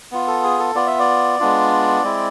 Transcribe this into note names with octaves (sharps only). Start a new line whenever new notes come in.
B3 F4
A4
G#4
A4
B3 F4 D5
E5
D5
G#3 B3 D4 F4
G#3 C4 E4